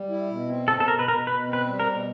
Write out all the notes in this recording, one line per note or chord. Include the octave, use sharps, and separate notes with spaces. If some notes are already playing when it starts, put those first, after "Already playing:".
Already playing: G3
E4
B2
C4
B2 A4
A4
B2 A#4
B4
B2 A#4
B2 B4
C4
B4
G3
A#4
B2